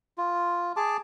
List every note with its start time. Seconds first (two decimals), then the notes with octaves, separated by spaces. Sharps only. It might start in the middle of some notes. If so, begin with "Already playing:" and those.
0.18 F4
0.76 G#4 A5 D6